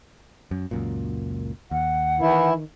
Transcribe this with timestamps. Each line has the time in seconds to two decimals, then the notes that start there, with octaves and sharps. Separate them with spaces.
0.51 F#2
0.71 C#2 F#2 A#2
1.71 D#2 F#5
2.20 D#3 E3 E4